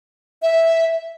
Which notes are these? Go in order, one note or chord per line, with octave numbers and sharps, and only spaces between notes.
E5